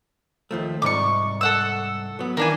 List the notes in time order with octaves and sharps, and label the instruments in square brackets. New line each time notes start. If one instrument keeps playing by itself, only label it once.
[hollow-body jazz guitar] D#2 F3 A3
[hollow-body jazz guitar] C2 G#2 D5 [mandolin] C#6 D6
[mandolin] A4 F#5 E6
[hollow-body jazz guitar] F#3 B3
[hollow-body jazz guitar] D#3 E3 [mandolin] A#3 D4 G#5